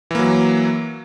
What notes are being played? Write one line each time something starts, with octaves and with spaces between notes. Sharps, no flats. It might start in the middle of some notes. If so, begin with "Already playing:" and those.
E3 F#3 A#3